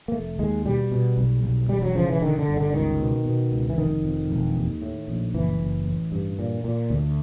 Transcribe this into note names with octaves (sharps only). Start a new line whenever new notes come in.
A#3
F1 A3
D#2 G#3
B2 G3
B2
B1
B1
E1 G3
F#3
C#3 F3
E3
D3 D#3
D3
G1
D3
C#2 D#3
B2
B2
C#2
E3
F1 D#3
F2
E1
D#2
A2
A#1
F#1 E3
F#1
A1
G2
A#2
A#2
D2